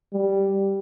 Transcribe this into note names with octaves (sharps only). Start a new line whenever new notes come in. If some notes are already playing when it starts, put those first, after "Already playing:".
G3